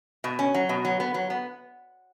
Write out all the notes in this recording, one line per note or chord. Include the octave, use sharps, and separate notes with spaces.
B2
C#4
F#3
B2
F#3
B3
F#3
B3